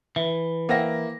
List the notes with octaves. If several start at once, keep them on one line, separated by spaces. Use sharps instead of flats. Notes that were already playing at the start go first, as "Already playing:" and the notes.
E3 E5
A#3 E4 C5 F#5 G5 A#6